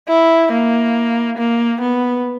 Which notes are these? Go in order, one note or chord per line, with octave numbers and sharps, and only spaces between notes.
E4
A#3
A#3
B3